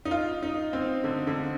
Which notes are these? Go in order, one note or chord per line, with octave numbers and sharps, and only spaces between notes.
D#4
F4
D#4
C4
D3
D3